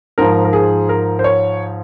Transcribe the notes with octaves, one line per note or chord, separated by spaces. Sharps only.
G#2 F3 A#4
A#4
G#4
A#4
C5
C#5